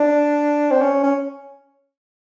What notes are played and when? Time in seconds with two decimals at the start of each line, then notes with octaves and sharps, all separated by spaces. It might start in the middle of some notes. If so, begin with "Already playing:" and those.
Already playing: D4
0.71 C4
0.81 C#4
1.04 C#4